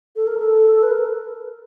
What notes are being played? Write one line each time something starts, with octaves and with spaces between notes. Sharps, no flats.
A4
A#4
A4
B4
A#4